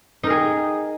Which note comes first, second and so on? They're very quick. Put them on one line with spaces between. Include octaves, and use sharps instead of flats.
D#4 A#4 G#4